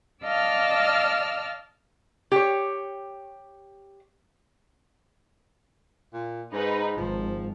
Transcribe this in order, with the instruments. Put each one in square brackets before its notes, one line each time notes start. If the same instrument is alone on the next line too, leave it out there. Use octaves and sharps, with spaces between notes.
[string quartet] D5 D#5 F5 A5 E6 F6
[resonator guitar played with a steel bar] G4 C#5
[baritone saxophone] A#2
[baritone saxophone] G#2 [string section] D#4 B4
[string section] G#1 [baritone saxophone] F3